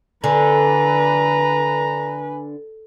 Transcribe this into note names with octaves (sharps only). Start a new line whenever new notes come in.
D3 B4 G#5 A#5